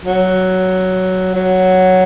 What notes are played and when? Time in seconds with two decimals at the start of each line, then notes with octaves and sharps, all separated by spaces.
0.06 F#3
1.35 F#3